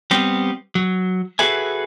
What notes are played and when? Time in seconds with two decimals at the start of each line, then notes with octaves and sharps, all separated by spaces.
0.11 G3 B3 C4 G4
0.75 F#3
1.39 F#4 G#4 A4 B4 E5 G#5